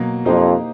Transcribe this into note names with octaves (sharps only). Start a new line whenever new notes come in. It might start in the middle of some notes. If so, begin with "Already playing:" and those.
Already playing: B2 F#3 A#3
F2 A#3 D#4 G4 C5